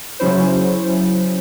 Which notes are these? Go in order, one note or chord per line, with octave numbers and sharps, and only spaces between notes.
C#3 F#3 C#4 E4 C5